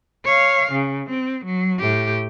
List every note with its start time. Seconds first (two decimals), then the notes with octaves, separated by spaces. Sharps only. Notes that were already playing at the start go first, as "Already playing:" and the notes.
0.25 C#5 F5
0.72 C#3
1.10 C4
1.45 F#3
1.79 A2 G4